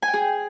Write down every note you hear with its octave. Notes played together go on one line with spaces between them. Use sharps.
G#5
G5
G#4